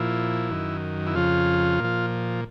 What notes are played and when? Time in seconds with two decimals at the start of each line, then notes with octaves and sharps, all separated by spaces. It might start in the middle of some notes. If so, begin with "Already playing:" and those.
Already playing: A#2 F3 E4
0.51 F#2 D#3
1.07 E4
1.15 F2 C#3 F3 F4
1.80 A#2 F3